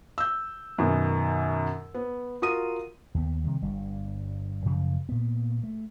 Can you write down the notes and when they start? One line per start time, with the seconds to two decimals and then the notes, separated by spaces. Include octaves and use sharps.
0.18 E6 G6
0.78 F#2 B2 D#3
1.94 B3
2.42 F4 F#4 A#4 D#6 D#7
3.15 D#2 G3 B3
3.44 C3 D#3 G3
3.62 G1 G2 G3
4.65 F#2 C#3 F3
5.09 A#2 B3
5.63 A3